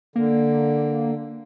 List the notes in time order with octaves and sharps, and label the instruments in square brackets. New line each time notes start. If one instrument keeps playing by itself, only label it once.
[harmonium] D3 [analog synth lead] A#3